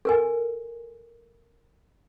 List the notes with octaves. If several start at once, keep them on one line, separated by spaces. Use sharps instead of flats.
A4 A#4 G#5